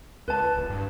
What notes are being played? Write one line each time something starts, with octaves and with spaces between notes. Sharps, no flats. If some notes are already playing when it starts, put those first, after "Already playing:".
C#2 B4 A5
D1
G2